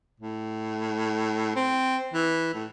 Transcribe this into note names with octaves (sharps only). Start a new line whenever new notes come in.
A2
C4
E3
A2